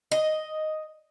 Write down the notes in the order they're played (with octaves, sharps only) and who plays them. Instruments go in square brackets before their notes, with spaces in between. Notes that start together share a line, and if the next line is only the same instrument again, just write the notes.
[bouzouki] D#5